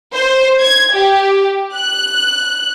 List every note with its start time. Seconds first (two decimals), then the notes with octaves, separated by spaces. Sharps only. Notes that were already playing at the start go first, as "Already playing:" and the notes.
0.13 C5
0.60 G#6
0.92 G4
1.74 F#6